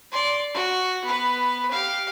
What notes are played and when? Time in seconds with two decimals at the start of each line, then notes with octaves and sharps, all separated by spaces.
0.12 D5 C6
0.54 F#4
1.05 B3 B4
1.71 G4 F5